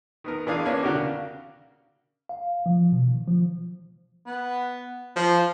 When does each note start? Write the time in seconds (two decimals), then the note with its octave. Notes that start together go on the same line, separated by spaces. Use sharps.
0.24 D#3 B3 A#4
0.46 A1 E3 D4 G#4 F5
0.65 A#3 B3 C#4 D4 C#5 D5
0.82 D3 F#4 G4 A#4
0.95 C#3
2.29 F5
2.66 F3
2.92 B2
3.07 D#3
3.28 F3
4.27 B3
5.16 F3